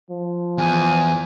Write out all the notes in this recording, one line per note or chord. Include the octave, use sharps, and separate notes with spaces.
F3
E2 G#5